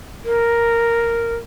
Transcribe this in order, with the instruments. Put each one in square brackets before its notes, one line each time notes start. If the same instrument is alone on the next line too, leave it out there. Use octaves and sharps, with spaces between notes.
[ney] A#4